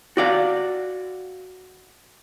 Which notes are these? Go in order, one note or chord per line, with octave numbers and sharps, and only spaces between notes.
F#4 D5 F5